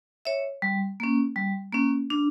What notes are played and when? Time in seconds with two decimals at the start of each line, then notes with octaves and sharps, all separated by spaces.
0.25 C#5 E5
0.62 G3
1.00 A#3 C#4
1.36 G3
1.72 A#3 C#4
2.10 D4